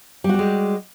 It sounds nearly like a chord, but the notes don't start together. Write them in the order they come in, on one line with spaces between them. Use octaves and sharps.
G3 F#4 G4 G#3